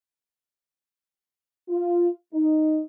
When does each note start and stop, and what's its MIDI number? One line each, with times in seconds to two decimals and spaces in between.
1.69 2.09 65
2.34 2.80 63